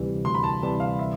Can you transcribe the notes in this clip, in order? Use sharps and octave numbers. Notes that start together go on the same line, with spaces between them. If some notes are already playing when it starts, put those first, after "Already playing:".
Already playing: D2 C3 E3 G3
D2 C6
B5
A5
C3 E3 G3 A5
F5
E5